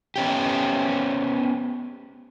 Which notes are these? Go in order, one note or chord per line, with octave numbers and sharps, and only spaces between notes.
B3 C#4 G4